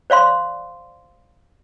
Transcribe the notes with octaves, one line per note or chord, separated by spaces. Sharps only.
C5 D5 F5 C6